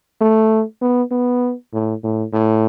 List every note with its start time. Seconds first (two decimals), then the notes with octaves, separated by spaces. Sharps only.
0.21 A3
0.82 B3
1.11 B3
1.73 A2
2.04 A2
2.33 A2